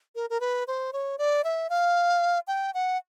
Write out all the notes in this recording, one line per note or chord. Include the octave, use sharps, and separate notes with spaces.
A#4
A#4
B4
C5
C#5
D5
E5
F5
G5
F#5